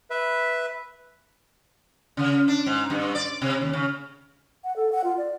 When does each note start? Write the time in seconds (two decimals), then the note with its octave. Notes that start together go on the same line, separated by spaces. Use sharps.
0.10 B4 E5
2.17 C#3
2.48 D4
2.66 G#2
2.90 G2
3.15 D5
3.42 C3
3.61 D#2
3.73 C#3
4.64 F#5
4.76 A4
4.92 F#5
5.04 F4
5.17 D5